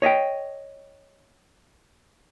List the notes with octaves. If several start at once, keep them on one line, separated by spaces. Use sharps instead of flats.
C#5 D#5 E5 G5